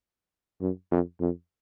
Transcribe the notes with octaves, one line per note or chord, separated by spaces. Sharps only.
F#2
F2
F2